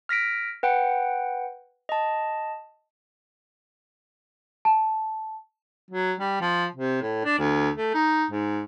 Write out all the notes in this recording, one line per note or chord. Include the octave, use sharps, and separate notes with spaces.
F6 A#6 B6 D7
B4 F#5 G5
D#5 A5
A5
F#3
G3
F3
C3
A2
D4
D2
A3
D#4
G#2